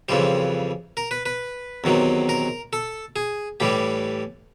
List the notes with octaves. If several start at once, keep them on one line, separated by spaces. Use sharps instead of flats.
F2 C#3 E3 G3 C5
A#4
B4
B4
E2 C3 D#3 F#3
A#4
A4
G#4
A2 E3 G3 G4